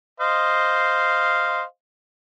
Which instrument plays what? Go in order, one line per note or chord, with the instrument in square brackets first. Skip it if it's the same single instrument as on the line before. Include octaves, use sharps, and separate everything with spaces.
[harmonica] C5 D#5 F5